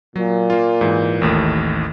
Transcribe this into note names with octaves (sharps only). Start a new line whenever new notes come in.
A#2 F#3
A#3 F4
G#2 E3
A1 D#2 A2